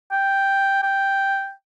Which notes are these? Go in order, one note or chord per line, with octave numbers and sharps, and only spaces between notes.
G5
G5